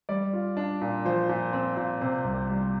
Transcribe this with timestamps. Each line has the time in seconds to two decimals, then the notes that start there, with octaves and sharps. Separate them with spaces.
0.09 G3 D5
0.33 F4
0.57 D4
0.81 A#2
1.05 F3 C5
1.29 A#2
1.53 C4
1.77 A#2
2.01 C3 C5
2.24 C2
2.50 G3